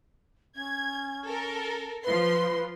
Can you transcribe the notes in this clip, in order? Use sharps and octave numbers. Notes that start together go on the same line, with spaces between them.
C#4 G#6
A4 A#4
F3 B4 C6